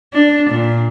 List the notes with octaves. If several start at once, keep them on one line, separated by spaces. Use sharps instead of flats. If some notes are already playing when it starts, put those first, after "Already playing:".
D4
A#2